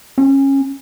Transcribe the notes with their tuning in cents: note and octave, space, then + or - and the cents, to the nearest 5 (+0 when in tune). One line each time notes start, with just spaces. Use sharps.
C#4 -20